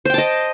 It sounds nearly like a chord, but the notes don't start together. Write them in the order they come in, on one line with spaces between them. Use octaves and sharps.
C5 G5 A5 D#5